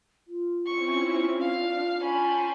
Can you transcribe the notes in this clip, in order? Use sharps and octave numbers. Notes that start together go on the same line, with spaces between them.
F4
C4 C#4 E4 C#6
D4 F5 F6
C#4 G5 A5 B5 C6